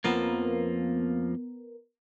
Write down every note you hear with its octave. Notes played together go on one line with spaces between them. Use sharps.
F2 F3 A#3 B3 A#4